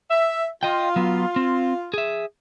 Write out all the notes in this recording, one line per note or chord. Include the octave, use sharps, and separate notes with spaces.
E5
F4 D#5 G5
F#3 B3
C4
G#4 E5